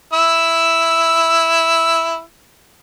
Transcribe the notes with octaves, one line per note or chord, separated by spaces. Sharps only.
E4 E6